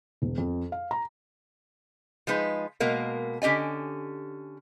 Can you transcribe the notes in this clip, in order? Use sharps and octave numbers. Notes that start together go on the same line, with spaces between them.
E1
F2
F5
A#5
F3 G#3 D#4 B4
B2 G#3 A#3 A#4
D3 C#4 G4 D#5 G#5